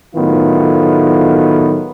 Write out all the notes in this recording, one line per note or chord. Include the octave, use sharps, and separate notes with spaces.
A2 D#3 F#3 A3 B3 F4